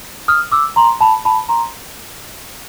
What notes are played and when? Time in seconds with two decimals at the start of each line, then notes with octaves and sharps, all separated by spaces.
0.28 D#6 F6
0.52 D6 E6
0.76 A#5 C6
1.01 A5 B5
1.25 A5 B5
1.49 A#5 C6